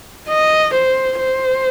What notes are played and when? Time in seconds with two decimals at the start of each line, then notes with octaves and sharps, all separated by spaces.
0.29 D#5
0.74 C5
1.19 C5